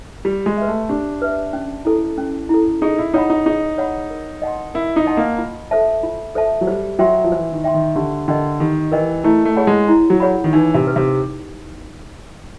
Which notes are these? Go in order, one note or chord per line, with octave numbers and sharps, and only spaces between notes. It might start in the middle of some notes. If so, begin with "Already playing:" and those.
G3 G4
G#3
B4 E5
A3
D4 G4
B4 E5
C#4
E4 A4
C#4
E4 A4
D#4 G#4
E4
D#4 C#5 F#5 B5
D#4
D#4 G#4
C#5 F#5 B5
A#4
D#5 F#5 A5 C6
E4 A#4
D#4
D#5 F#5 A5 C6
A#3
F4
A4 C5 E5 A5
F4
A4 C5 E5 A5
F#3
G3 C5
F#3 E5 G5 C6
F3
E3 C5
D#3
E5 G5 C6
D#3
D3 G4
D3 A#4 D#5 G5
D#3 G4
E3 A#4 D#5 G5
A3 E4
A3
G#4 C#5 F#5 B5
G#3
E4
F#3
G#4 C#5 F#5 B5
D#3
E3 D#4
C3
G4 B4
C3